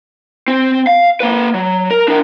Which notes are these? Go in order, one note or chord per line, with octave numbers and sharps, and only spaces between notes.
C4
F5
A#3 B4
F#3
A#4
D4 A#4